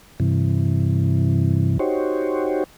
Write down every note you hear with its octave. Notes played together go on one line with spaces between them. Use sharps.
G2 C3 E3
D#4 F#4 G4 C5 C#5